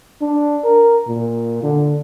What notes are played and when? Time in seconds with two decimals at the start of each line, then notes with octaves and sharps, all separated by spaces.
0.21 D4
0.64 A#4
1.08 A#2
1.63 D3